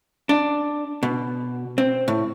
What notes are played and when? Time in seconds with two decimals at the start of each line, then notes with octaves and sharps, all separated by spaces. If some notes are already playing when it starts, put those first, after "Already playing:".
0.29 D4
1.03 B2
1.78 C4
2.08 A2